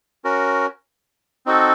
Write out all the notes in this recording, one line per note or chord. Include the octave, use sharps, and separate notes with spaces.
C#4 F#4 A#4
C4 D#4 F#4 A4